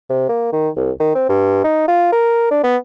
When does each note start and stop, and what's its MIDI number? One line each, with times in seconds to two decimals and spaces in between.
0.10 0.28 48
0.29 0.50 58
0.53 0.69 51
0.76 0.91 36
1.00 1.11 51
1.15 1.27 60
1.29 1.61 43
1.64 1.86 63
1.88 2.10 65
2.12 2.49 70
2.51 2.60 62
2.64 2.77 59